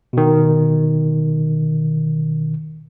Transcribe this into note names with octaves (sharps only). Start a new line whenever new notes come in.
B2 D#3